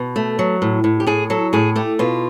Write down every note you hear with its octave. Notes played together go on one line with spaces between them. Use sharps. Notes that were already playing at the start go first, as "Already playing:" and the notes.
Already playing: B2
A3
F#3
A2
A2
G4
A2 G#4
F#3 A4
A2 G#4
A3 G4
B2 F4